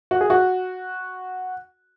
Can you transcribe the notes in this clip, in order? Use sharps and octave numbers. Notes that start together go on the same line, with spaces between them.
F#4
G#4
F#4